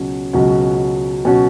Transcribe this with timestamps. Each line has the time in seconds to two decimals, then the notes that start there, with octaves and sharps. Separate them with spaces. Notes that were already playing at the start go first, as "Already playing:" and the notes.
Already playing: C#2 B2 F#3 C#4 F#4
0.33 C#2 B2 F#3 C#4 F#4
1.25 B2 F#3 C#4 F#4